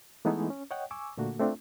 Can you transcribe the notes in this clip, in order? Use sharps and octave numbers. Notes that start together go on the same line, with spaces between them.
E3 G#3 A3 B3 D#4 E4
C#4
C#5 D#5 F#5 G5
G#5 C#6 D6 E6
A#2 D3 A3 A#3 F#4
A3 C4 D4 F4